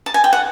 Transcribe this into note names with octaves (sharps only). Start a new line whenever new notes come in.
A5
G#5
G5
F#5